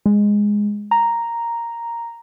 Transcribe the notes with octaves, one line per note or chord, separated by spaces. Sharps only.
G#3
A#5